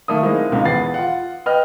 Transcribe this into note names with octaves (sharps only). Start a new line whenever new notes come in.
D#3 A3 A#3 D#6
G#3 A#3 C4 D#4 E4
G#1 C#2 D#4
E2 B4 F#5 A6 C7
F4 F#5
B4 D#5 G5 F6